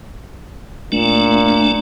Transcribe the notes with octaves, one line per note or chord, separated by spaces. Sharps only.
A#2 A3 D4